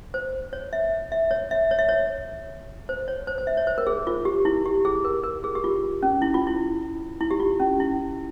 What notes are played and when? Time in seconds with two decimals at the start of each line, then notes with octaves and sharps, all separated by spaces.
0.14 C5
0.53 C#5
0.73 E5
1.12 E5
1.31 C#5
1.51 E5
1.71 C#5
1.79 E5
1.89 C#5
2.89 C5
3.08 C#5
3.27 C5
3.38 C5
3.47 E5
3.57 C#5
3.67 C5
3.78 A#4
3.87 G#4
4.07 F4
4.25 G4
4.45 E4
4.66 G4
4.85 G#4
5.05 A#4
5.23 A#4
5.44 G#4
5.55 G4
5.64 F4
6.03 C#4
6.22 E4
6.34 F4
6.47 E4
7.21 E4
7.31 G4
7.40 F4
7.60 C#4
7.80 E4